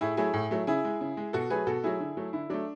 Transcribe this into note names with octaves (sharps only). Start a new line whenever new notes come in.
A2 E4 G#4
F#3 A3 E4 G#4
A2
F#3 A3
C#3 E4 G#4
G#3
C#3
G#3
B2 F#4 A4
F#3 A3 G#4 B4
B2 F#4 A4
F#3 A3 E4 G#4
D3
F#3 A3
D3 E4
F#3 A3 D4